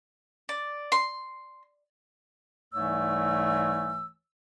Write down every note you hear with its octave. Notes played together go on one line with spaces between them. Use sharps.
D5
C6
C2 G#2 E3 A3 C#5 E6